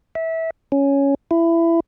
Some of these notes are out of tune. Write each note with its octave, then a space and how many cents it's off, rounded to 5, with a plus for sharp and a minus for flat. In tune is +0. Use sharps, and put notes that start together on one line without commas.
E5 -20
C#4 +5
E4 +20